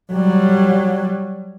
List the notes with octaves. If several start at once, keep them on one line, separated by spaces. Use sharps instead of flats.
F#3 G3